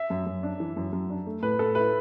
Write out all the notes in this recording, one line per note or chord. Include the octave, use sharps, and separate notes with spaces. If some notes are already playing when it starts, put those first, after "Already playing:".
Already playing: E5
F#2
F#2
D4
E3
F#2
F#2
D4
A3
A2 B4
A2 A4
E4 B4